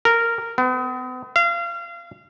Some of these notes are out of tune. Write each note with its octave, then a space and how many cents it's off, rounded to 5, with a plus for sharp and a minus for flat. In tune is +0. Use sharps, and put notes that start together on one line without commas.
A#4 -10
B3 +40
F5 -30